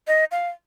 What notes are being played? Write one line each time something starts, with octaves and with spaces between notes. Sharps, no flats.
D#5
F5